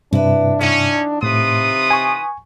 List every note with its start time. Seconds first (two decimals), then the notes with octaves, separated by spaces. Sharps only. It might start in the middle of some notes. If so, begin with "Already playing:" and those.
0.13 G2 C3 D4 E4 B4
0.61 E3 C#4 D#4 F#5
1.23 A2 C3 F4 B4 D#6
1.91 G#5 C#6